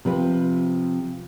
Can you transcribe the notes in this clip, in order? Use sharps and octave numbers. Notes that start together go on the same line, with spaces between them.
C3 F3 C4 B4